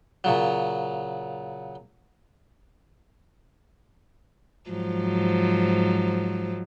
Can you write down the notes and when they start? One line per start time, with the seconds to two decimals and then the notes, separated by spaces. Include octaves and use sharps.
0.24 A#2 C#3 F#3
4.70 G#2 F3 F#3